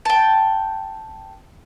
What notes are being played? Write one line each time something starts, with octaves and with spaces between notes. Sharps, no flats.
G5 A5